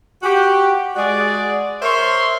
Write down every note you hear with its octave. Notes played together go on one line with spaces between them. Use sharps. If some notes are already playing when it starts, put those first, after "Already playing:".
F#4 G4
G#3 F#4 G#4 D5
A#4 C5 C#5 E5 C6